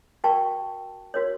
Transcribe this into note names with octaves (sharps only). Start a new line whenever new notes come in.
F#4 A#4 G5 A5 C#6
F#4 A#4 C#5